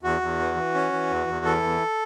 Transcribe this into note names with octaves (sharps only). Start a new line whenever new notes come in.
E2 F#4
E2
E3
E3
C#4
E3
E2
E2
E3 A4
E2